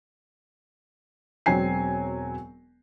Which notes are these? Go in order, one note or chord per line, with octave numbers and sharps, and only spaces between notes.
E1 F#3 C4 G#5 C7